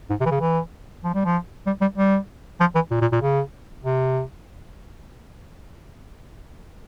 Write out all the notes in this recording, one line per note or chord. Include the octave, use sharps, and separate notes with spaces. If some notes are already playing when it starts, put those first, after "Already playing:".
G#2
C3
E3
C#3
E3
F3
G3
F3
G3
G3
G3
F3
E3
A#2
A#2
A#2
C#3
C3